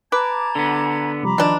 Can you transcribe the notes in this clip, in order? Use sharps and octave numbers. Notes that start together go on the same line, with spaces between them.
B4 A5 A#5 D6 G#6
D3 B3
C3 F3 G3 A#5 B5 D6
B2 D#3 F3 D4